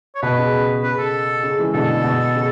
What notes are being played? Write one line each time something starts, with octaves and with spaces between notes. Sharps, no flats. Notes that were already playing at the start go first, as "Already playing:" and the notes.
C#5
B2 B4
C#3
C#3 B4
A4
C#3
E3 G#3
B2 D3 A4
B2
C#3